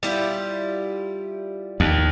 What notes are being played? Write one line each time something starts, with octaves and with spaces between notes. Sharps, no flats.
G3 E4 F4
D#2